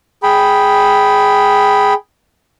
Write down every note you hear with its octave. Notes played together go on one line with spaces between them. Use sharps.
G#4 G5 B5